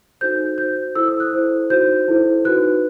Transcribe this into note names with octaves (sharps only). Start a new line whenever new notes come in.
D#4 F#4 A4 C5 G6
F#4 C5 G6
E4 A4 C5 E6
D#6
F#6
E4 A4 C5
D#4 F#4 C5 G6
E4 A4 C5
D#4 F#4 B4 F#6